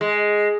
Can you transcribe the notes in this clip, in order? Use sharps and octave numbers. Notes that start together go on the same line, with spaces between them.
G#3